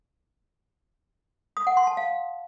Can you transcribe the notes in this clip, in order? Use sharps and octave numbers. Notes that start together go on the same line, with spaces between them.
D#6
F#5
C6
A5
F5